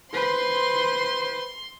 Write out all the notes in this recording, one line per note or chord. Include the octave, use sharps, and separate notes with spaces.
B4 C5 C6